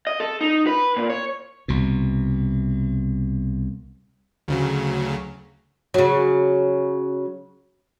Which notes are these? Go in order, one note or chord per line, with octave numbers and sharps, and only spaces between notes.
D#5
A4
D#4
B4
A#2
C#5
C2 B2
D2 C#3 F#3
C#3 F#3